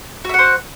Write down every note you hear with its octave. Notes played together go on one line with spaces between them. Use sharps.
F#4 C5 E5 F#5